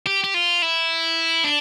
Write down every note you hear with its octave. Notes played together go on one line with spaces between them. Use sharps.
G4
G4
F4
E4
D4